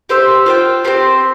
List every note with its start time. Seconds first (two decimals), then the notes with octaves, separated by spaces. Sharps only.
0.09 G4 C5 E5
0.46 F4 C5 G5
0.84 C4 G4 C5